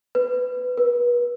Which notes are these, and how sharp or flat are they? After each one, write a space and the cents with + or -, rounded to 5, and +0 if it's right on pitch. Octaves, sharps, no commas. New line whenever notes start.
B4 +20
B4 -30